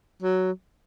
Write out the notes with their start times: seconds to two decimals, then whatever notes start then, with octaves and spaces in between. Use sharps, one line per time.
0.22 F#3